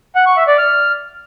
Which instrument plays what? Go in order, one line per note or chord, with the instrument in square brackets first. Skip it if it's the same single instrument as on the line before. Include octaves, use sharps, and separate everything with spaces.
[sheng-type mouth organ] F#5
C#6
E5
D5
F6